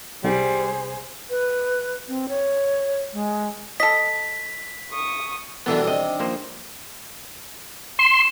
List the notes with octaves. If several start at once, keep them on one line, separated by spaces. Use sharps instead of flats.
C2 G3 G#4 C5
B4
C4
C#5
G#3
A4 D#5 B6
C#6 D#6
B2 D3 E3 F#3 G3 B3 D4 A#4
C3 D#3 D4 D#5
F3 A#3 C5
C6 E7